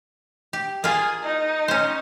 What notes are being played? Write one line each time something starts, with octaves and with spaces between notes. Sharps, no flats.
G4
A#3 F4 G#4
D#4
C#4 C5